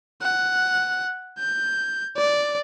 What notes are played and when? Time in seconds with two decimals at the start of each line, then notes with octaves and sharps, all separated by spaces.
0.22 F#5
1.40 G6
2.17 D5